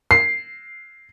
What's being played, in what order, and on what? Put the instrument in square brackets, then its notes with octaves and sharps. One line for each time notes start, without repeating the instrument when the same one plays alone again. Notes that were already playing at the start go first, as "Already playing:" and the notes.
[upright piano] C7